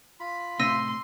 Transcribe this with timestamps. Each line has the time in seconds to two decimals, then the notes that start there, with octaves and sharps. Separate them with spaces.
0.20 F4 B5
0.60 A2 C3 C6 E6 A#6 D#7